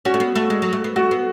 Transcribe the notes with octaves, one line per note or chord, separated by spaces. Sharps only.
C#4 F#4
A3
B3
A3
G#3
F#3
A3
B3
A3 F#4
B3